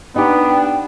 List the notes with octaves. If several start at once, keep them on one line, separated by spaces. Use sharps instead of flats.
B3 D4 D#4 G4 G5